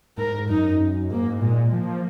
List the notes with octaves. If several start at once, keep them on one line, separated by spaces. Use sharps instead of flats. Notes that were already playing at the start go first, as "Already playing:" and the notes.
G#2 A#4
F#2 D#4
F#2
G#2 A#3
A#2 G#3
F3 A#3